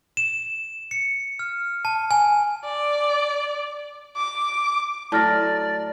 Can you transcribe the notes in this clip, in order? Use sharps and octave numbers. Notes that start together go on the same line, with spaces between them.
E7
C#7
F6
A5
G#5
D5
D6
A2 F#3 D5 A5 F6 A#6